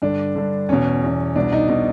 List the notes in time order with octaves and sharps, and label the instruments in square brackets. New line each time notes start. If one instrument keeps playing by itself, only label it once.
[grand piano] G2 D3 D4
G2 D3
E2 B2 C#4
E2 B2
C2 B2 D4
D#4
B2 D#4